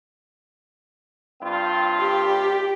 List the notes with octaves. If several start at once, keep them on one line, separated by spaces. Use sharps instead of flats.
G2 C4 F4
G4